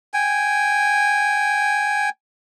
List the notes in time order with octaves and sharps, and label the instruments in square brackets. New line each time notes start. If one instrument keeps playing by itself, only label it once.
[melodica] G5 G#5